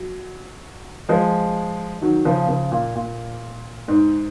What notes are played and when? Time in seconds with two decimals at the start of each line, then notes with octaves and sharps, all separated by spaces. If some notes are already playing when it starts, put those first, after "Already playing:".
Already playing: F#3
1.09 F3 G#3
2.01 D#3 F#3
2.25 C#3 F3
2.48 C#3 F3
2.72 A#2
2.95 A#2
3.88 G#2